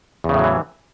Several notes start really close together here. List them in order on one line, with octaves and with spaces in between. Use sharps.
E2 C#3 A2 F#3 E3